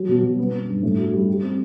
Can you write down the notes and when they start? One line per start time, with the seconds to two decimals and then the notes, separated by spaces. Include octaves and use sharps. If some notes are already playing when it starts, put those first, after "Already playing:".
Already playing: F#3
0.09 B2
0.23 B2
0.39 B3
0.52 B3
0.68 G2
0.82 A2
0.97 F#4
1.13 G3
1.28 G4
1.42 C4